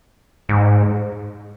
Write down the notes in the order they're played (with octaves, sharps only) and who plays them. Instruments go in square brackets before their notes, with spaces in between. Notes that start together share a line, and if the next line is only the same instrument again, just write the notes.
[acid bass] G#2